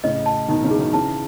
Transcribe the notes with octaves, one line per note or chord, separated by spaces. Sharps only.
A2 C#3 D#5
A5
B2 D#3 D#4
C#3 E3
G#4
D#3 F#3
C#3 E3 A5